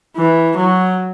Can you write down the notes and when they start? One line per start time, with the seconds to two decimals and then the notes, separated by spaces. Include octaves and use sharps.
0.16 E3
0.56 F#3